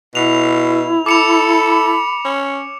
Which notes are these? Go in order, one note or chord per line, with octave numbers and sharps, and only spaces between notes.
B2 E4 F7
A4 B5 D6 C#7 F7
C#4